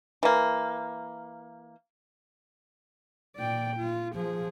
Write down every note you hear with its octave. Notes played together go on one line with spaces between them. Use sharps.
E3 A#3
A#2 D5 G5
F4
F3 G#4